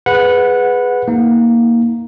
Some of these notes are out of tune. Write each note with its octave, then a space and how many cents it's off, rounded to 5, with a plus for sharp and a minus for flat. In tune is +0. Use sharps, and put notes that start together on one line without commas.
G#4 +0 B4 +5 F#5 -15
A#3 +0 D#4 +30